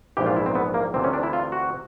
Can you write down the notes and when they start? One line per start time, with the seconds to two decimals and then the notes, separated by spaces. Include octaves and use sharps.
0.17 A#1 G#2 E3 G4
0.26 F4
0.36 E4
0.46 C4
0.55 B3
0.74 A#3
0.94 D2 C3 E3 C4
1.04 C#4
1.13 D4
1.23 E4
1.33 F4
1.52 F#4